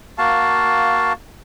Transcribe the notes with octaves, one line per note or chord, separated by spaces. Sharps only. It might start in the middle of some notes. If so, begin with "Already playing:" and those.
A#3 F#4 F5 A5